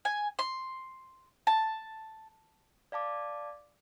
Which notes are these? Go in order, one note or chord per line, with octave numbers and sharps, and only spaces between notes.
G#5
C6
A5
D5 F5 A5 D6